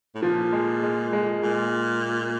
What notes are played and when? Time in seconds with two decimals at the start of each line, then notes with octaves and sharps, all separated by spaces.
0.15 A2
0.22 A#2 F3
0.53 G#3
0.83 G#3
1.13 G#3
1.43 A#2 G#3